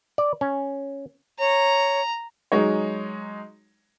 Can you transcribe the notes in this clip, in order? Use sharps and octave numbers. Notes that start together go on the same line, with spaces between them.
D5
C#4
C#5 A#5
F#3 G#3 D#4 C#5